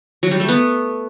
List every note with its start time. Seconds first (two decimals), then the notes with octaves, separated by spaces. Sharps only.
0.23 F#3
0.31 G3
0.40 A3
0.48 B3